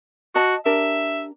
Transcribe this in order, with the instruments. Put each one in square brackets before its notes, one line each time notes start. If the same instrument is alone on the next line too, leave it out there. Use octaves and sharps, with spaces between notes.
[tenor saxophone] F#4 [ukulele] D#5 A5
[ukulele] D4 G4 A#4 [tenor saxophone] E5